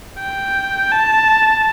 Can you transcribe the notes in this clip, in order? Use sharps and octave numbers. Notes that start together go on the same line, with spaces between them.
G5
A5